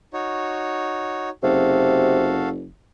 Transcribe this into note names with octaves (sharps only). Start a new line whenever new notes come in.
D#4 F#4 C#5
F#1 C3 F#4 A4 F5